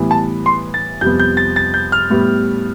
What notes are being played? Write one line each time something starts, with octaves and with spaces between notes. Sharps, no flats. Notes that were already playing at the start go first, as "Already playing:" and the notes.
Already playing: A2 E3 G3 B3
A5
C6
A6
F2 C3 G3 B3 G6
G6
A6
A6
G6
F6
A2 G3 B3